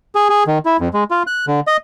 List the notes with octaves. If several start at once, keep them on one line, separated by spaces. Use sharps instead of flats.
G#4
G#4
D#3
E4
F2
G#3
F4
F#6
D3
D#5